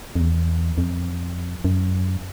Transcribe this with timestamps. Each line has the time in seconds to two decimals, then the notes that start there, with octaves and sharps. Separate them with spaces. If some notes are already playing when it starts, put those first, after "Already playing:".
0.16 F2
0.20 E2
0.78 F2
1.65 F#2